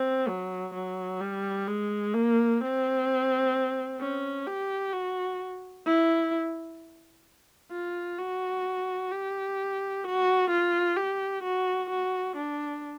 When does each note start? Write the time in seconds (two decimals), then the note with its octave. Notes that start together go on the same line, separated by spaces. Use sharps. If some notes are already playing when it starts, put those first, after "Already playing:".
Already playing: C4
0.28 F#3
0.75 F#3
1.21 G3
1.68 G#3
2.14 A#3
2.61 C4
4.00 C#4
4.46 G4
4.93 F#4
5.86 E4
7.71 F4
8.18 F#4
9.11 G4
10.04 F#4
10.50 F4
10.97 G4
11.43 F#4
11.90 F#4
12.36 D4